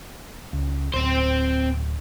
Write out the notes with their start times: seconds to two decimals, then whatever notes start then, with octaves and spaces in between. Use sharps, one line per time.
0.53 C#2
0.94 D1 C4 C5